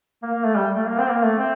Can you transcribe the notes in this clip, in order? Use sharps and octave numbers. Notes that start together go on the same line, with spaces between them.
A#3
A#3
A3
G3
A3
A#3
C4
A#3
A3
C4